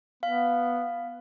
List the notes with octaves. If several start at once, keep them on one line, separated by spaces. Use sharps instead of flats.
B3 F5